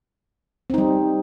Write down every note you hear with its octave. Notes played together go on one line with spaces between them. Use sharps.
G3 C4 D#4